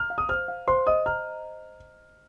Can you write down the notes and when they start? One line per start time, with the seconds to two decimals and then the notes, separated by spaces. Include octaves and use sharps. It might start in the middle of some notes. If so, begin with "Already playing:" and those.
Already playing: A#5 F6
0.10 F5
0.18 D#6
0.29 C5 F6
0.48 F5
0.68 C5 C6
0.87 D#5 D#6
1.06 A#5 F6